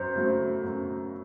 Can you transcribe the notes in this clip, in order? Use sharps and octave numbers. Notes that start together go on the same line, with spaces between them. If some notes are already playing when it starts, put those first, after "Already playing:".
Already playing: F#2 C5
C#3 F#3 A3
F#2